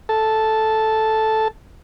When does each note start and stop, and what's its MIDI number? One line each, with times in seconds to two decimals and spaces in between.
0.09 1.48 69
0.09 1.48 81